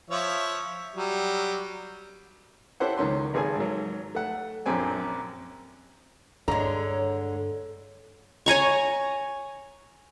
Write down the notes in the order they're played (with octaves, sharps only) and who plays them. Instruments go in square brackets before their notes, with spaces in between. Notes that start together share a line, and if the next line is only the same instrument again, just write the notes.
[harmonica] F3 C#5 E5
F#3 G3
[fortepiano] C#4 E4 G4 A4 C5 F#5
C#2 D#3 C#4 C6
G#1 A#3 G#4 A4 G#5
G#2 F#3
A3 F#5
A#1 F#2 C4 G#5
[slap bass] G2 D4 [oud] D3 G#3 [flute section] C#5 [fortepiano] A#5
[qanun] C#5 G#5 A#5 C#6